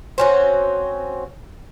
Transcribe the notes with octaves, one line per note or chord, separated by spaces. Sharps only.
C4 C#4 F#4